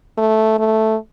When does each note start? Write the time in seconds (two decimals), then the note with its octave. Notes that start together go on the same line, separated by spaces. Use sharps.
0.17 A3
0.59 A3